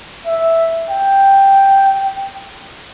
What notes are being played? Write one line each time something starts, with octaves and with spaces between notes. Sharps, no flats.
E5
G5